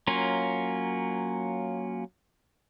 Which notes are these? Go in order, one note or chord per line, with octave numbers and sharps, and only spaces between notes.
F#3 A#3 C#4 F4